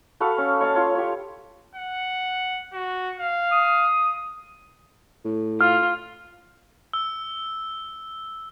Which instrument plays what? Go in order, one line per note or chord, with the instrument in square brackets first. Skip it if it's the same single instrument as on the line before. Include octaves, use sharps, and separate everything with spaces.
[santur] F#4 A4 B4 F5
C#4
C#5 D#5 F5 A5
F4 C#5 C6
G4 C#5
[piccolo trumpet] F#5
F#4
F5
[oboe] D#6
[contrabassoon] A2
[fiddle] F4 [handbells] F6
[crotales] E6